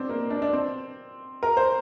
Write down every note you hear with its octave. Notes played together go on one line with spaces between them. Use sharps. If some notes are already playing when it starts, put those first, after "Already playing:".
Already playing: C4 D4
A#3
D4
D4
C4
A#4
C5